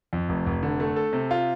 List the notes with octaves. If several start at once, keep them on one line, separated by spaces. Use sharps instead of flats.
F2
F1
F1
D3
A3
A4
C3
F4